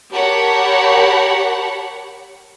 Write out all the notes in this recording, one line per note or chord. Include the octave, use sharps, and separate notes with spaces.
G4 A#4 C#5 F#5 A5 B5